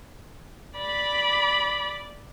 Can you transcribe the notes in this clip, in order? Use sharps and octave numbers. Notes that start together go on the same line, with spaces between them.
D5 B5